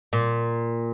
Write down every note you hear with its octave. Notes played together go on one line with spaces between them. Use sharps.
A#2